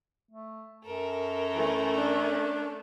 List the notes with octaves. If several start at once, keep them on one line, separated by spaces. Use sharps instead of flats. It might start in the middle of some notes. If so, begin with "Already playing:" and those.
A3
F#2 A4 A#4
E3 A3 C#4
D4